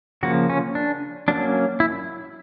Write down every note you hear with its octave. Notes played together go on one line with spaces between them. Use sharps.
C#3 F3 A#3 F#4
C#4
D4
F#3 A#3 C#4 D4
E4